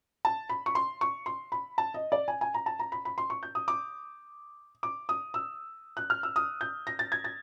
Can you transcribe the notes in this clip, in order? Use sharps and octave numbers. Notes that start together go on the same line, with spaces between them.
A5
B5
C#6
C6
C#6
C6
B5
A5
D#5
D5
G#5
G#5
A#5
A5
A#5
B5
B5
C6
C#6
G6
D#6
D6
D6
D#6
E6
F#6
F6
E6
D#6
G6
A#6
A6
G#6
A6